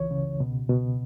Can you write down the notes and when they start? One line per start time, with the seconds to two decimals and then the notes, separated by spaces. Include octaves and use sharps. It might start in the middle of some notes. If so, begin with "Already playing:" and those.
Already playing: C#2 E3 C#5
0.11 C#3
0.40 B2
0.70 B2